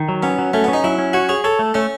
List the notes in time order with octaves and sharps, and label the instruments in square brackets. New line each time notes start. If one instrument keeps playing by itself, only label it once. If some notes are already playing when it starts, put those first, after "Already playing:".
Already playing: [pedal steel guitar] D#3
F#3
[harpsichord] B3 [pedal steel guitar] C#4
[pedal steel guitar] F#3
[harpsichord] A3 [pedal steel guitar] C#4
[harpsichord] B3 [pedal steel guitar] C#4
[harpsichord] D#4
[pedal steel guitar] F#3 [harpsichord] E4
[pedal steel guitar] C#4
[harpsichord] F#4 [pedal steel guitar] C#5
[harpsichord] G#4 [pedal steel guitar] C#5
[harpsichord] A4 [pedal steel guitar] C#5
[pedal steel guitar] A3
[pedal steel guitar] A3 [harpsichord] C#4